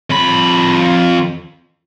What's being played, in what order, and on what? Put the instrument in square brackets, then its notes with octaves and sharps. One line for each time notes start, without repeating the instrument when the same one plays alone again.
[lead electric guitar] F2 B5